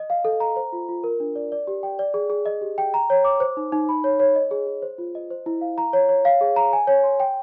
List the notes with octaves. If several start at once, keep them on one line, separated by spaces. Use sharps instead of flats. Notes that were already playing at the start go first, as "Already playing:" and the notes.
Already playing: D#5
F5
A4
A#5
C5
F4
F4
A#4
D4
D5
D5
G4
G5
D5
G#4
G#4
D#5
G4
G5
A#5
C#5
D6
C5
D#4
D#4
B5
C#5
C#5
D#5
G#4
G#4
C5
F4
D#5
C5
E4
F5
A#5
C#5
C#5
F5
G#4
A#5
G#5
C#5
C6
G5